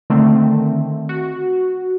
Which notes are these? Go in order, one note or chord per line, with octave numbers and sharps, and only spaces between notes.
D3 D#3 A3 C4
F#4